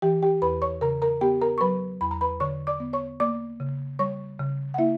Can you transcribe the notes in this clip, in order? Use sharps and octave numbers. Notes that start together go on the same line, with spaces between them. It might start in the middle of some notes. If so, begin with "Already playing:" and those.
E3 G4 G5
G4 G5
E2 B4 B5
C#5 C#6
C#3 A#4 A#5
A#4 A#5
B3 G4 G5
A#4 A#5
C#6
F#3 B4 B5
E2 B5
A#5
B4 B5
D3 C#5 C#6
D5 D6
B3
C#5 C#6
A#3 D5 D6
C#3
G3 C#5 C#6
C#3
F#5
A#3 E4 E5